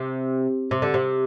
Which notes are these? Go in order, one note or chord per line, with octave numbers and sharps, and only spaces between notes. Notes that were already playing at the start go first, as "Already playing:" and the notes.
Already playing: C3
C3
D3
C3